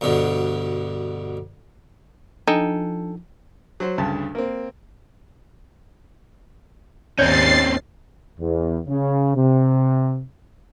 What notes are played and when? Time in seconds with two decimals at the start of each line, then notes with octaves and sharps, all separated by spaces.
0.01 D2 G2 B2 D3
2.48 F3 D4 D#4 A4 G5 G#5
3.80 F#3 C5
3.98 D2 G2 C#3 A5
4.35 A#3 C4
7.19 D#2 G#2 C4 C#4 C#5 D5 A6 C7
8.40 E2
8.87 C#3
9.36 C3